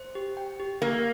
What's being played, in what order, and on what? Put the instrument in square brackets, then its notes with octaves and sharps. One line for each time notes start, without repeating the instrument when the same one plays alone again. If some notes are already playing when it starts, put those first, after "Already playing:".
Already playing: [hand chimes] C5
G4
G5
G4
[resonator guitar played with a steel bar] A#3 [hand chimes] A#4